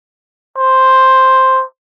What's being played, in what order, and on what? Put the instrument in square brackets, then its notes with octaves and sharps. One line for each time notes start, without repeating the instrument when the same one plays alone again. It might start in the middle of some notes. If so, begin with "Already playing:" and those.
[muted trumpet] C5